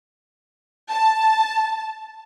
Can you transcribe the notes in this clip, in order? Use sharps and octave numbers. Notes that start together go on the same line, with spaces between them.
A5